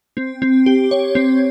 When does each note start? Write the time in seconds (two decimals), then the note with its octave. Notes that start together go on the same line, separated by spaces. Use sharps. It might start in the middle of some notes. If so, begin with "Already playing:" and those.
0.17 C4
0.42 C4
0.66 G4
0.91 C#5
1.15 C4